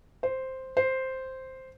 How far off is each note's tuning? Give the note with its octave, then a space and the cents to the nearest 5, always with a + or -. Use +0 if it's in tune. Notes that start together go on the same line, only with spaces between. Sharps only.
C5 +0
C5 +0